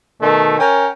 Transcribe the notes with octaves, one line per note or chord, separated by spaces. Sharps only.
B2 D#3 A3
C#4 A#4 G5